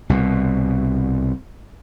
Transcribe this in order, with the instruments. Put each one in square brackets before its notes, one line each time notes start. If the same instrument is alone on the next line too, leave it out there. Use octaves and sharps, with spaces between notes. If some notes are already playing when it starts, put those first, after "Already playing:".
[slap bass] C2 B2